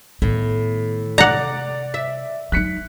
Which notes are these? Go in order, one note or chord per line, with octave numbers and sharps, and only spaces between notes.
A2 D#3 B3
C3 D5 F#5 A#5
E5
F#3 D#4 F#6 B6 C#7